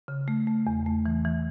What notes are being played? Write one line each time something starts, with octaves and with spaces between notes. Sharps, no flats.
C#3
A3
A3
E2
A3
E3
E3